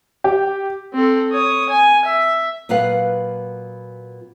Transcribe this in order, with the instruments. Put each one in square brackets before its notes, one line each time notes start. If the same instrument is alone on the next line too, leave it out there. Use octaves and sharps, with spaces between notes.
[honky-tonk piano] G4
[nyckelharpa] C4 A4
C#5 D#6
G#5
E5
[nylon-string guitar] A#2 F#3 B3 B4 F5 F#5